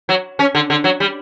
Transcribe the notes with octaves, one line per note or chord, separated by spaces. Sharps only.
F#3
C#4
D3
D3
F#3
G3